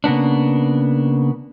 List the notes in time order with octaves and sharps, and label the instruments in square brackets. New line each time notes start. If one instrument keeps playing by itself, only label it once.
[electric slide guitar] C#3 A#3 B3 D4